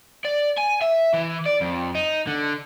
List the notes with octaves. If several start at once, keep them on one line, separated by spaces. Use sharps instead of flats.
D5
G#5
E5
E3
D5
F2
D#4
D3